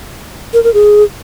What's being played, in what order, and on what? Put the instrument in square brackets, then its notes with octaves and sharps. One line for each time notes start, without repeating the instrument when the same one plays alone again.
[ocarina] A#4
A#4
G#4